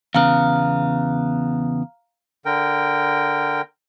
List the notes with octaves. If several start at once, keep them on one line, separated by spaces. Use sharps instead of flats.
E2 C#3 B3 F5 A#5 F6
D3 A#4 G5